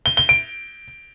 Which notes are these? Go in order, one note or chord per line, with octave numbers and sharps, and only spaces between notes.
G7
G7
D7